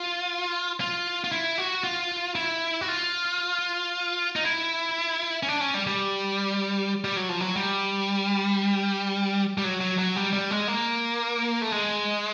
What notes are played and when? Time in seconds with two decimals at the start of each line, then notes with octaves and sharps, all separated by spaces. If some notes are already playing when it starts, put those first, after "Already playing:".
Already playing: F4
0.80 F4
1.24 F4
1.32 E4
1.58 F#4
1.84 F4
2.35 E4
2.81 F#4
2.88 F4
4.36 D#4
4.44 E4
5.43 C#4
5.48 D4
5.61 C#4
5.74 G3
5.87 G3
7.04 G3
7.16 F#3
7.29 F3
7.40 F#3
7.56 G3
9.58 G3
9.64 F#3
9.81 F#3
9.98 F#3
10.16 G3
10.33 G3
10.51 G#3
10.68 A#3
11.62 A3
11.72 G#3